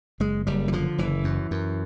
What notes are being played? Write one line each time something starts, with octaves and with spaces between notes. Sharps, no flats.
F#1 G#3
F#1 G3
E3
D3 F3
F#1 E3
F#2
F#2